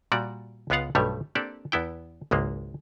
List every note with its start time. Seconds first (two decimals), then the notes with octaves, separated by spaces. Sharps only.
0.12 A#2 G3 F#4 D5
0.70 C#2 G#3 B3 F4 F5 F#5
0.95 B1 G2 F3 G3 A3 C#5
1.35 A#3 C4 D4 G4 A4 D5
1.72 E2 B3 E4 G5
2.31 G#1 C#2 G#3 A#3